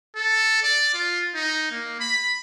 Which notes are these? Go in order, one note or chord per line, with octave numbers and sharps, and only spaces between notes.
A4
D5
F4
D#4
A#3
B5